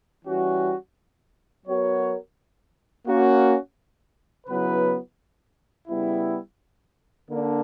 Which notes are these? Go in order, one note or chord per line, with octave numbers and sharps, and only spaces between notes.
E3 G3 C#4 F#4
F#3 B3 F#4 A#4 C#5
A#3 C#4 F#4
C#3 F#3 B3 E4 B4
C#3 G3 B3 E4
D3 A#3 D4